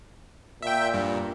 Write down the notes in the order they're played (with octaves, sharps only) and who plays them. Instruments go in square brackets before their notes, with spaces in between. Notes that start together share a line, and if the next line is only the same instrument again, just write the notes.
[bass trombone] A#2 [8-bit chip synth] E5 G5
[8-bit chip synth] G2